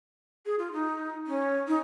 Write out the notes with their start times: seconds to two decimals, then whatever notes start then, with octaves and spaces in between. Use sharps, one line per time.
0.46 G#4
0.59 F4
0.73 D#4
1.27 C#4
1.68 D#4